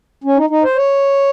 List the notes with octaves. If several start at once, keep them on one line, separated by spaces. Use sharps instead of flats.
C#4
D#4
D#4
C5
C#5